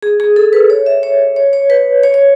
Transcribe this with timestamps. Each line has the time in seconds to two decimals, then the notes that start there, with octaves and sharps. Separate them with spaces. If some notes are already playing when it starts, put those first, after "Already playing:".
0.02 G#4
0.20 G#4
0.36 A4
0.53 B4
0.70 C#5
0.86 E5
1.03 C#5
1.36 C#5
1.53 C#5
1.70 B4
2.03 C#5
2.14 C#5